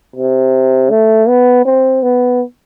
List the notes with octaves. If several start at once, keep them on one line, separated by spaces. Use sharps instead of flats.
C3
A3
B3
C4
B3